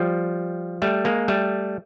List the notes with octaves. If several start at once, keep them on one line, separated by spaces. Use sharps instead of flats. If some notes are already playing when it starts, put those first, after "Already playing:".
Already playing: F3 G3
G3 A3
G#3 A#3
G3 A3